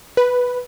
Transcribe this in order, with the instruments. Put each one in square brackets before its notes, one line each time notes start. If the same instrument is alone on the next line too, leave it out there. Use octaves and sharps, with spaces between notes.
[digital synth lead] B4